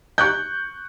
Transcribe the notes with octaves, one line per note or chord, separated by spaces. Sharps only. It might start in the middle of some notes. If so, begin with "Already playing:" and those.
C#6 F#6 G6